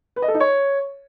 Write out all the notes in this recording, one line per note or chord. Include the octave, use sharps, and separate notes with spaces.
B4
D#5
A4
D#4
C#5